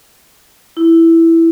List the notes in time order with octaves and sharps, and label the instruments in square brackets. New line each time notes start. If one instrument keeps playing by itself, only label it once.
[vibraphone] E4